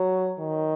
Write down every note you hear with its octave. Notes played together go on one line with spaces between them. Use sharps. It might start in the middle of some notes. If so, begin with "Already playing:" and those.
Already playing: F#3
D#3